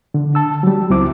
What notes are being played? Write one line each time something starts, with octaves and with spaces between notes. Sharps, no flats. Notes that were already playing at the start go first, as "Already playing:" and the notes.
D3
A5 E6
F#3 G3
C#2 F#3 C4 E4 D6